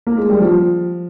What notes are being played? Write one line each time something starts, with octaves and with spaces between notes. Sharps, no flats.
A#3
G#3
G3
F3